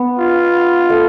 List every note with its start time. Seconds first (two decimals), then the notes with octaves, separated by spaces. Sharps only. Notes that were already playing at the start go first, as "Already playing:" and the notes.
Already playing: B3
0.19 F4
0.89 A3